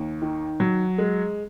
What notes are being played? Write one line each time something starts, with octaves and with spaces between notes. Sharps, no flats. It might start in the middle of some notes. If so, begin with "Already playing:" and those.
Already playing: D#2
D#3
F#3
G#3